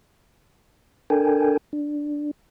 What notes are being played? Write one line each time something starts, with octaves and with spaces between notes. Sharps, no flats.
D4 A4 A#4 G5 G#5
D4